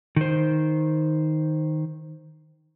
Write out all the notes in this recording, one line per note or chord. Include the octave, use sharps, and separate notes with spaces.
D#3 C5